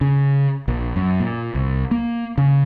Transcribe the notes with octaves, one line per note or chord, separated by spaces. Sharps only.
C#3
A#1
F#2
A#2
C2
A#3
C#3